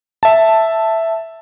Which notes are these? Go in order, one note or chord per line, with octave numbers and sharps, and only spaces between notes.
E5 A5